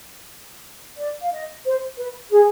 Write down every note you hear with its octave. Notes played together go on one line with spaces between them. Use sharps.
D5
F5
D#5
C5
B4
G#4